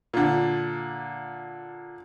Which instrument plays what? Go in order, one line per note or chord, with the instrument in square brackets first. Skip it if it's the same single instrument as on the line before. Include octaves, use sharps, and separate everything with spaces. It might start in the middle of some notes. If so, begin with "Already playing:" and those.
[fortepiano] A#2 D3